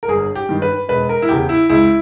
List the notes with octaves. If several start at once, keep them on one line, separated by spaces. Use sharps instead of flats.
A#4
G1 G#4
G4
G2 D#3
B4
E1 B4
A#4
E4
E2 C#3 G4
E4
C#2 E4